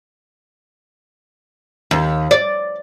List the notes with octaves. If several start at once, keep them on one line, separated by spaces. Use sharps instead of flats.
D#2
D5